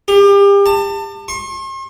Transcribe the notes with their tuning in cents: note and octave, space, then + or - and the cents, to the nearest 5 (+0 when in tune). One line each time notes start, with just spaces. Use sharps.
G4 +35
A5 +30
C6 +45